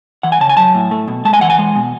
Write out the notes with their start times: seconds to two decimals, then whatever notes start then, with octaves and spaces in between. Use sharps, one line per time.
0.23 E3 F#5
0.32 G#5
0.41 C#3 A5
0.49 G#5
0.57 F#3 A5
0.75 A2
0.91 A3
1.08 B2
1.25 G#3 A5
1.33 G#5
1.41 E3 F#5
1.50 G#5
1.58 G#3
1.76 B2